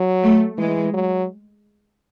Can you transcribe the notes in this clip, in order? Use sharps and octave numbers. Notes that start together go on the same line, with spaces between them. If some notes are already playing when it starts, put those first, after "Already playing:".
Already playing: F#3
A3
E3 G#3
F#3